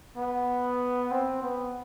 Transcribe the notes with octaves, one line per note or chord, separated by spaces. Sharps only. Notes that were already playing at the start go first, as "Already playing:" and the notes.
B3
C4
B3